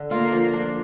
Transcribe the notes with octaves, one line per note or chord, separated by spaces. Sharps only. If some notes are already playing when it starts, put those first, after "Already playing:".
Already playing: D3
A#3 F4
F3
D4